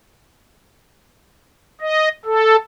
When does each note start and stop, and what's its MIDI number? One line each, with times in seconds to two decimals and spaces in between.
1.81 2.09 75
2.25 2.56 69